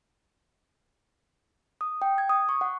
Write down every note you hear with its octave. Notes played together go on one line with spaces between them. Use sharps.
D#6
G5
G#6
D#6
C#6
F#5